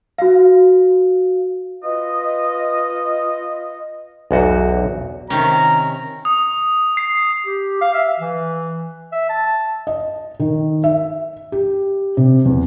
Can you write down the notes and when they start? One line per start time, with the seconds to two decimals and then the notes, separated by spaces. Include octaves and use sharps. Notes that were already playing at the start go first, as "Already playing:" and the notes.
0.18 F#4 F5
1.83 F4 B4 D#5
4.31 B1 E2 F#4
5.30 C3 D#3 C#4 A#5
6.25 D#6
6.97 C7
7.46 G4
7.81 F5
7.95 E5
8.20 E3
9.12 E5
9.29 A5
9.87 D#5
10.40 D#3
10.84 E5
11.52 G4
12.17 C3
12.45 E2